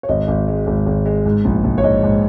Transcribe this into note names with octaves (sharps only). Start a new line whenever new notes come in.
C#5
G#1 D#5
G#1
G#3
G#1
G#1
G#3
G#2
A#1
A#1
C#5
G#2 D#5
G#2